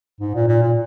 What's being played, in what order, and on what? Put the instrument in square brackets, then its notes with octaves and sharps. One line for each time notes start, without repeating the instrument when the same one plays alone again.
[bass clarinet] G#2
A#2
A#2
A#2